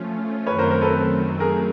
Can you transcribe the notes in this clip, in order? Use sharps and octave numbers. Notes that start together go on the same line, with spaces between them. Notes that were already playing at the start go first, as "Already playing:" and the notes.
Already playing: F3 A3 C#4 F4
F#2 D#3 F#3 A3 C4 B4 C#5
A#4 C5
A#4 C5
A4 B4
C#3 F#3 A3 G#4 A#4